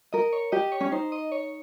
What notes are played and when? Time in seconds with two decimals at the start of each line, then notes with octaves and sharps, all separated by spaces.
0.13 A#4 D#5
0.33 C#5
0.52 G4 D#5
0.72 C#5
0.80 C#4
0.92 D#4 C5
1.12 D#5
1.32 C#5